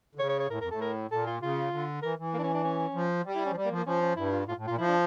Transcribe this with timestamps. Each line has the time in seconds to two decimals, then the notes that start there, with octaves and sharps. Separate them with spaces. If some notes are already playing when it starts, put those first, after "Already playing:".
0.15 D3
0.19 C#3 C#5
0.29 C#5
0.40 C#5
0.50 A2 A#4
0.60 F2 A#4
0.70 A2 A4
0.81 A#4
1.11 A#2 A4
1.26 F4
1.42 C#3 F4
1.72 D3
2.02 E3 A#4
2.19 E3
2.33 A#3
2.38 D4
2.43 C#4
2.54 D4
2.64 C#4
2.94 F3
3.25 G3
3.35 E4
3.46 C#4
3.51 F3
3.55 G3
3.65 A#3
3.71 F3
3.76 A#3
3.86 F3 C#4
4.01 C#4
4.16 G2 E4
4.32 F4
4.47 A2 F4
4.57 A2
4.67 A#2 F4
4.78 F3 E4
4.88 D4